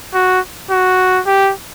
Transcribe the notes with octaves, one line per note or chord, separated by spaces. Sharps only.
F#4
F#4
G4